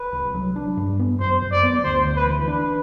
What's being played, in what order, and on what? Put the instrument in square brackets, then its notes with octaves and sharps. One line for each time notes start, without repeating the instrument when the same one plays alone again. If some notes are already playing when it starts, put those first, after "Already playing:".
Already playing: [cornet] B4
[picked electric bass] C2
F#3
D4
G2
B3
[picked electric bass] F#2 [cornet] C5
[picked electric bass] F#2
[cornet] D5
[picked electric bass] B3
[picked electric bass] D2 [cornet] C5
[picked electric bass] D2
[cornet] B4
[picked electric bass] E3
[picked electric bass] D4 [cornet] B4